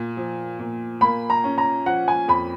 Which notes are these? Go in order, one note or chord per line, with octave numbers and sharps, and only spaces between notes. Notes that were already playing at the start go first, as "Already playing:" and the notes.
Already playing: A#2
F3
A#2
A#3 B5
A#5
C#4
A#5
F3 F#5
G#5
F2 B5